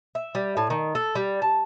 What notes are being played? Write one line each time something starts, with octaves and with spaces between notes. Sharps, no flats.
E5
G3
A2
D#3
A4
G3
A5